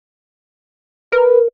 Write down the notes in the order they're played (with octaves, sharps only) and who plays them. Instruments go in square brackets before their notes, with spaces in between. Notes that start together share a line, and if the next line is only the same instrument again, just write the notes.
[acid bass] A#4 [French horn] B4